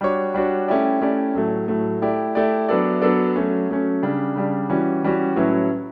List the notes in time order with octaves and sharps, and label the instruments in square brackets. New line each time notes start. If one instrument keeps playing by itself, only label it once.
[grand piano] G3 D4 F#4 C#5
G3 D4 F#4 C#5
A3 C#4 E4 G4 D5
A3 C#4 E4 G4 D5
A2 F#3 A3
A2 F#3 A3
A3 E4 G4 D5
A3 E4 G4 D5
F#3 B3 D4 A4 D5
F#3 B3 D4 A4 D5
F#3 A3 C#4
F#3 A3 C#4
C#3 G3 D4
C#3 G3 D4
E3 G3 C#4 F#4
E3 G3 C#4 F#4
A2 F#3 C#4 E4 B4